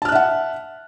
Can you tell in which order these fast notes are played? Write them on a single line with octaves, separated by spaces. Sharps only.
A5 F6 F#6 E5 F#5